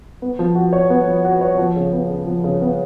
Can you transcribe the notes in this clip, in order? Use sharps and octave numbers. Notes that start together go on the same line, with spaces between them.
B3
F3
F#4
C#5
B3
F3
F#4
C#5
F3
C#3
B3
C#3
F3
C#3
B3